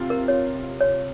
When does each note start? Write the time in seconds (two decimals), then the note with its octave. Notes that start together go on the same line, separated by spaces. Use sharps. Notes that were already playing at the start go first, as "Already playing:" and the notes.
Already playing: C3 F4
0.10 A#4
0.28 C#5
0.81 C#5